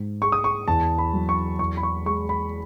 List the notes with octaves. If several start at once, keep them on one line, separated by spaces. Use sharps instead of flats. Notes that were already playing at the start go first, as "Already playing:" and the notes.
Already playing: G#2
G#3 C#6
D#6
C#6
E2 A5
B5
F#3
C#6
E2 C#6
B5
C#6
G#3 C#6
B5